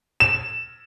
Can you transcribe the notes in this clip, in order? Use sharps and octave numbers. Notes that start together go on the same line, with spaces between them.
E7